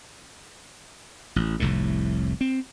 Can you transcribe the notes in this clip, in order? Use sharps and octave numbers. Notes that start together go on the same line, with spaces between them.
A1
F1 C2 F2 A2
C4